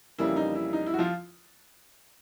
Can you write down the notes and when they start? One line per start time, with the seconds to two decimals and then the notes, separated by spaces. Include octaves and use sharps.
0.19 F2 C#3 E3 G3 A#3 E4
0.36 D#4
0.55 E4
0.73 D#4
0.86 E4
0.94 F#4
0.99 F3 F4